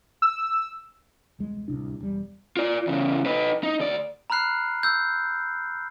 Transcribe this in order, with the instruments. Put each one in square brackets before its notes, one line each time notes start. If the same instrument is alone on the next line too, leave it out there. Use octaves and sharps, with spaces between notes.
[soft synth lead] E6
[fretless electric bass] E1 C2 G#3
D1 C2 C3 D4
E1 G3
[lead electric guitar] F4 D5
E2 C#3
D#4 B4
D#4
D2 D5
[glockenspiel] A#5 B5 F6 F#6 C7
E6 G6